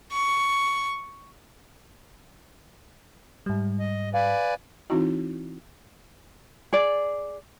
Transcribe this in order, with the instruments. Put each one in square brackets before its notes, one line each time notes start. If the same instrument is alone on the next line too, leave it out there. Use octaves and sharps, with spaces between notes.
[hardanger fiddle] C#6
[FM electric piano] G#2 G3
[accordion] D#5
[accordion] B4 D5 G#5 [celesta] F5
[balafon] E3 C4 D#4 E4 F#4
[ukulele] G#4 D5